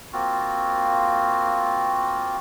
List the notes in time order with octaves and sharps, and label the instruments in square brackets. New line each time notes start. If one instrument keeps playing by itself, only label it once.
[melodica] A#3 C4 F4 F#4